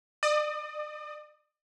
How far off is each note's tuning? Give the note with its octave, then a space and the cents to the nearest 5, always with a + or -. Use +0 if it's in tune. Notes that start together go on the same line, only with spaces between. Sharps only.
D5 +40 D#6 +5